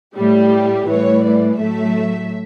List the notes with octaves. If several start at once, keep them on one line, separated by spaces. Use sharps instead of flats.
A2 G3 G4
A2 E3 G3 C#5
D5
A2 F#3 A3 E5